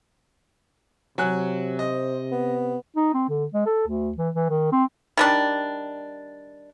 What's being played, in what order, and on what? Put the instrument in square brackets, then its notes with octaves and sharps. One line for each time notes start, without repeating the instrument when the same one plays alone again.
[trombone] C3 [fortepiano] F#3 G#5 F#6
[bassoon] C5 [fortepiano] D#5
[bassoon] B3
[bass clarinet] D#4
C4
D3
G#3
A4
D2
E3
E3
D#3
C4
[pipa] D#3 G3 D4